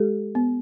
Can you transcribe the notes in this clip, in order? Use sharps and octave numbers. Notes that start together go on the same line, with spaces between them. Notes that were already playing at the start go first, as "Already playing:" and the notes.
Already playing: G#3 G4 A4
B3